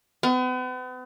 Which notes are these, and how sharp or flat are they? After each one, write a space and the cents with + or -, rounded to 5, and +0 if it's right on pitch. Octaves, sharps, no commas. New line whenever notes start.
B3 +40